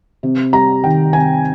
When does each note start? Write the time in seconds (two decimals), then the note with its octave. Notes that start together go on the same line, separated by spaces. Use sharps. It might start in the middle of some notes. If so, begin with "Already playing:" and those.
0.23 C3
0.53 G3 A#5
0.83 D#3 G5
1.13 C3 G#5